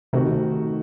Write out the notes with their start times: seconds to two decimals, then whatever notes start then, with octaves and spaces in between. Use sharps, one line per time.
0.13 C3 D#3 A3 D#4 F#4